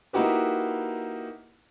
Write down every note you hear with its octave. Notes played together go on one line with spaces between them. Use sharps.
A#3 D#4 E4 F#4 G4 B4